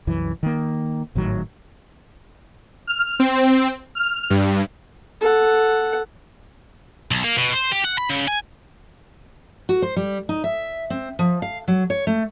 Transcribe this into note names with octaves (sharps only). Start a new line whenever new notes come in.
C2 F#2 E3
D#3 A#3
G#1 A2 D#3 F#3
F6
C4
F6
G2
A4 F#5
B1
A#3
B2
C5
G4
F#5
B5
C#3
G#5
F#4
C5
G3
D#4
E5
C4
F3
F5
F#3
C#5
A3